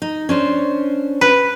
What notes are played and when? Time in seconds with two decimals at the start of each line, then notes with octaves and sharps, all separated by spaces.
0.02 D#4
0.29 C#4 D4 C5
1.21 B4